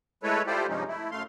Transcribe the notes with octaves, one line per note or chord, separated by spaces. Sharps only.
G#3 A3 E4 A4 B4 C#5
E4 F4 G4 A4 C5 D5
G2 C3 F3 G#3 C#4 D#4
A3 E4
F#2 A3 F5 C6